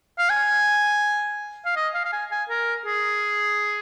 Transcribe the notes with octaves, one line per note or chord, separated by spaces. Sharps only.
F5
G#5
F5
D#5
F5
F5
G#5
G#5
A#4
G#4